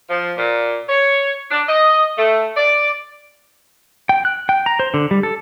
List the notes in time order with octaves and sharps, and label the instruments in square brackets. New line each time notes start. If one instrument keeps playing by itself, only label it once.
[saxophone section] F3
A#2
C#5
D4
D#5
A3
D5
[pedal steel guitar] G5
F#6
G5
A#5
C5
D3
G3
A4